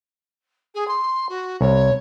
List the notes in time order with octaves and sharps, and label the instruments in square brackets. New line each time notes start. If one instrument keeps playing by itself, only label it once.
[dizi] G#4
C6
F#4
[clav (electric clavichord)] C2 [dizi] C#5